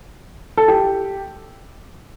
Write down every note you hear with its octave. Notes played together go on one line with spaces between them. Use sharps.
A4
G4